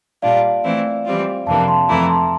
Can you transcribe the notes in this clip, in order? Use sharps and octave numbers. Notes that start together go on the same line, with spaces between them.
A#2 G3 D4 F4 D5 F5
E3 A3 C4 E4
E3 G3 C4 F4
F2 C3 E3 A#3 D4 F5 A5
A5 C6
F2 E3 A3 E4 A#5 D6
A5 C6